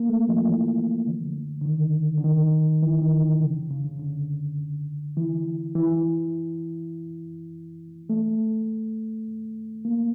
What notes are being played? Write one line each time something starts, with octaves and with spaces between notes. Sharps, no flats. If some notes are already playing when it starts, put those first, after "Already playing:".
Already playing: A#3
A3
F3
F3
E3
D3
D3
D#3
D3
D#3
E3
D#3
D3
C#3
C#3
D3
D3
E3
E3
A3
A#3